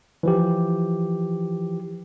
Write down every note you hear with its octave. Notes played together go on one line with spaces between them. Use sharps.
E3 F3 G4